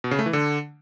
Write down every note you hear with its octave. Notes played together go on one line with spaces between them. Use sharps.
B2
C#3
A3
E3
D3